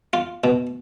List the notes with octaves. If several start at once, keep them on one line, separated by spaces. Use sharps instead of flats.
F4
B2